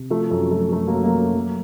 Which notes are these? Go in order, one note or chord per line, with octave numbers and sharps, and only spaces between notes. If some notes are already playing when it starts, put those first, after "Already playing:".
Already playing: C3
F3 A3
F#2 A3
F3 A3
F#2 A3
F#3 A#3
F#2
F#3 A#3
F#2
F#3